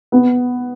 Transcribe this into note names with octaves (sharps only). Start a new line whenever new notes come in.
B3